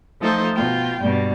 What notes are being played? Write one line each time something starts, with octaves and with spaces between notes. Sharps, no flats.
F3 A3 D#4 A4 C5
B2 F4 G5
G2 B2 G3